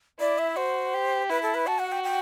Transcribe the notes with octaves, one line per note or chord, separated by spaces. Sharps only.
E4 D5
E5
F#4 C5
G4
E4 B4
A4
B4
F#4 A5
F#5
G5
G5